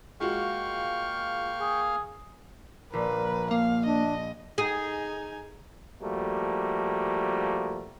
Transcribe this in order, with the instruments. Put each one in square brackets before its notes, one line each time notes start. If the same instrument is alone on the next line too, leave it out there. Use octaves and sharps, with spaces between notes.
[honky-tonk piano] G#3 F4 F#4 [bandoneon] A#3 F5 F6 [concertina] G5 C#6
[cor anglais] G#4
[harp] A#1 [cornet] A#4 [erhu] B4
[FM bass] A#3 [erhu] F5
[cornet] D4 [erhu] D#5
[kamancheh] D#4 G#5 [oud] G#4
[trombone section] F3 G3 A3 A#3 F#4